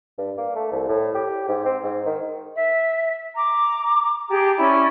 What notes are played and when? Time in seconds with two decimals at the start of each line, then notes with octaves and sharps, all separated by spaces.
0.18 G2
0.38 A#3
0.55 A3
0.72 C2
0.88 A2
1.15 G4
1.48 G#2
1.65 C4
1.83 G#2
2.06 D#3
2.55 E5
3.35 A#5 D6
4.28 G4 G#4 A5 A#5
4.56 C#4 E4 D5